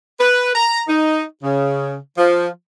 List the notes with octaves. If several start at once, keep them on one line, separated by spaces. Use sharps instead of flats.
B4
A#5
D#4
C#3
F3